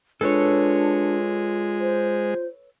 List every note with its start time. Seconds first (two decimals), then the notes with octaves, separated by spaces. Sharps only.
0.21 G#3 D4 F4 A4 B4 C#5
1.80 C5